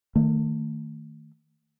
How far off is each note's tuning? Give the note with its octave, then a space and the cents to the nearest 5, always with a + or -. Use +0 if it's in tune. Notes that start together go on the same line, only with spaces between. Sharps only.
D#3 +0 A3 +30